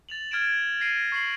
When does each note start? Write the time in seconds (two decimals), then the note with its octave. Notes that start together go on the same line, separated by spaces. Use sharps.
0.09 A6 F7 F#7
0.31 F6 G#6 A6 D7 E7
0.80 G#6 A#6 C7 D7 D#7
1.12 C#6 C7 F#7